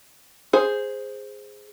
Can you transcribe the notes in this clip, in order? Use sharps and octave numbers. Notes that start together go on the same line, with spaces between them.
G#4 C5